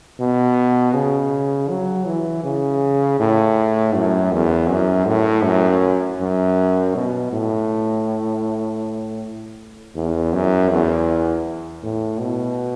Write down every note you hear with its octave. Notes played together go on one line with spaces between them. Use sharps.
B2
C#3
F#3
E3
C#3
A2
F#2
E2
F#2
A2
F#2
F#2
B2
A2
E2
F#2
E2
A2
B2